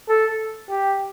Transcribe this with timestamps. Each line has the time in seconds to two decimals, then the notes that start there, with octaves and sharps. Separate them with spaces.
0.09 A4
0.69 G4